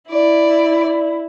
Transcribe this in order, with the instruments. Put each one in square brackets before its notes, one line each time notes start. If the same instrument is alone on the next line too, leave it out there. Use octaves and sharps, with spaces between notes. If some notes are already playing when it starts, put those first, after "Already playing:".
[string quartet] E4 [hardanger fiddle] D5